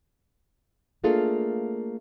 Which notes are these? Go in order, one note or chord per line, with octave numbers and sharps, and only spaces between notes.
A3 A#3 D4 F4 G#4 A4